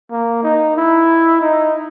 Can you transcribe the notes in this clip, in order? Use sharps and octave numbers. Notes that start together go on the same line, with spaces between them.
A#3
D#4
E4
D#4